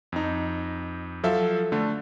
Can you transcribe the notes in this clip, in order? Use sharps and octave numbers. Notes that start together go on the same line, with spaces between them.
F2 D#4
F3 F#3 A4 E5 F5
D3 A3